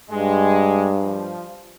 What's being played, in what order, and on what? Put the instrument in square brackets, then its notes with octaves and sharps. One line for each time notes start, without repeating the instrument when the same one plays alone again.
[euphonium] G2 [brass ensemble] G#3
[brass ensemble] F3